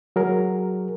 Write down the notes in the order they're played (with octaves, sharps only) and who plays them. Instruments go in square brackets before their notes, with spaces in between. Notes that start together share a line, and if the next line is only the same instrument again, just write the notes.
[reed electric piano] F#3 G#4 A#4